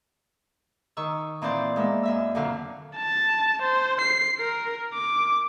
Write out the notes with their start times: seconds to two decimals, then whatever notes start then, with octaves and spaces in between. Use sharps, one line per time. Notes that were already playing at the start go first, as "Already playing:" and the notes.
0.97 D#3 C#6 E6
1.42 A#2 E3 C4 D5 C6 G6
1.76 G#3 A#3 B3 E5
2.03 F#2 E5 E6
2.35 F2 A#2 D3 F#3 F5
2.97 A5
3.63 C5
4.01 C7
4.39 A#4
4.94 D6